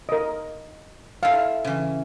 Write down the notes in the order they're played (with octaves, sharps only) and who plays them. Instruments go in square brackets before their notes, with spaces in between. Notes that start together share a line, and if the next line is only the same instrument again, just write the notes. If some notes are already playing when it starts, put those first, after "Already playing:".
[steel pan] A#4 D#5
[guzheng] E4 A4 [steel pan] F5
[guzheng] C#3 E3